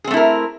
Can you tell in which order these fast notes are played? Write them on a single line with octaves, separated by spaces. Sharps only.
G#4 C4 A3 E4 A#4